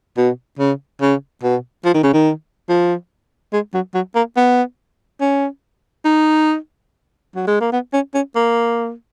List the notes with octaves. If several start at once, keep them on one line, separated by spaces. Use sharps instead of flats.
B2
C#3
C#3
B2
F3
D#3
C#3
D#3
F3
G#3
F#3
F#3
A#3
B3
C#4
D#4
F#3
G#3
A#3
B3
C#4
C#4
A#3